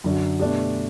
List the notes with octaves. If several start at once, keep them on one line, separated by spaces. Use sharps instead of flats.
F#2 D3 F#3
B2 A3 D4 G4